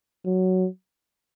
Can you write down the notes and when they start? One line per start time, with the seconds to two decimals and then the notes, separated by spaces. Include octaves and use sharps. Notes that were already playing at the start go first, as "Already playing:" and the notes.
0.26 F#3